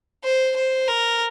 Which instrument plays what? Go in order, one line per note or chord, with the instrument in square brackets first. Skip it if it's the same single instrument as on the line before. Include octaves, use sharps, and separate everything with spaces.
[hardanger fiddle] C5
C5
A#4